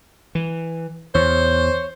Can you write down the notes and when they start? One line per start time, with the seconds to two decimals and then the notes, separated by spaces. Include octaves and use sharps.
0.35 E3
1.15 E2 C5 C#5